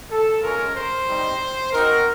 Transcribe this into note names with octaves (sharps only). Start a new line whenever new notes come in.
A4
G#3 C#4 F4 A#4
C5
G3 C4 D#4
C4 D#4 F#4 A#4